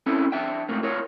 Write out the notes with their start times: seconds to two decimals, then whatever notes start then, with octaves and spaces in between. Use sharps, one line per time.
0.06 C4 C#4 E4 A4
0.32 D4 E5 G5
0.69 G#2 C3 A3 A#3
0.83 F4 A#4 C#5